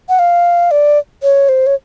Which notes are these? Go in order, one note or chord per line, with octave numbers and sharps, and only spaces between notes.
F#5
F5
D5
C#5
C5
C#5